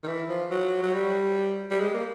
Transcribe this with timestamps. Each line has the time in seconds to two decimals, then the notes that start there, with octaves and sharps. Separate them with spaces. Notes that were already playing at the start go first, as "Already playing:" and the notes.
0.03 D#3
0.07 E3
0.29 F3
0.51 F#3
0.82 F#3
0.93 G3
1.71 G3
1.80 G#3
1.94 A#3